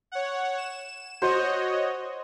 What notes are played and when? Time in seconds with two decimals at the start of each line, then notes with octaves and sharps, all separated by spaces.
0.12 C#5 F#5
0.58 E7
1.22 F#4 C5 C#5 D#5